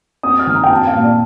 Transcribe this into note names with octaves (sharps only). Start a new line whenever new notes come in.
C4 D#6
F6
D#3
A#5
G5
C4 A5
F5
A#2
D5